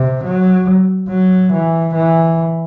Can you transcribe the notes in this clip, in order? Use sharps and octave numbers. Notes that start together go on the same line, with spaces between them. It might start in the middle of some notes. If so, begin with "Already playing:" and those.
Already playing: C3
F#3
F#3
E3
E3